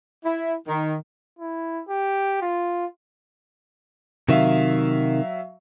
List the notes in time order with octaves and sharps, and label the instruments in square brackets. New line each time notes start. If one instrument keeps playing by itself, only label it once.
[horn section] E4
D#3
[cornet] E4
G4
F4
[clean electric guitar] C3 D#3 [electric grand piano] F#3 E5 F5